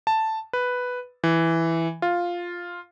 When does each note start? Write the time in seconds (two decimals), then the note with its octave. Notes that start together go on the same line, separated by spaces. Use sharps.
0.07 A5
0.53 B4
1.24 E3
2.02 F4